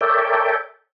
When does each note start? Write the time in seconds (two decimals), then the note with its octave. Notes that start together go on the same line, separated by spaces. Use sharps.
0.01 A4 A#4 C#5 D5 E5 G5